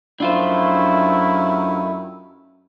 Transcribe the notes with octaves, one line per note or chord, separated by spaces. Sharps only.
F#2 D#3 A3 D4 E4 F4 C5